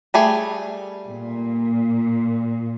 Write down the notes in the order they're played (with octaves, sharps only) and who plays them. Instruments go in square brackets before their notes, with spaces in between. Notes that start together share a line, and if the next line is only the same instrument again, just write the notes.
[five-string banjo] G3 A3 G#4
[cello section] A#2